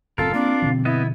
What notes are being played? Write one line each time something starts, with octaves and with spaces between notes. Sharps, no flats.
F#1 A2 C4 F4 A4 A#4
A#3 C4 D4
B2 D3 F3
B3 E4 D#5